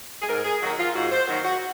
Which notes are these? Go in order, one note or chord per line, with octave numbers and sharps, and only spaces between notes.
G#4
G#2 A#4
G#4
D#3 F#3 A#3 D#4 F#4
F4
G#2 F#4
C5
D#3 F#3 A#3 D#4 F#4
F#4